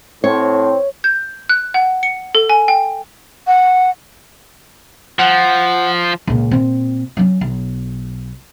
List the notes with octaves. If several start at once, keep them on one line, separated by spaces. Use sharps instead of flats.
A2 C4 C#5
G6
F#6
F#5
C#7
A4
G#5
G5
F#5
F3 F#5
C#2 A#2
A#2 C4
F#3 C#4
B1